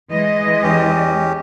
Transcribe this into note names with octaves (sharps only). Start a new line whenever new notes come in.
E3 G#3 D#5
E2 C#4 G4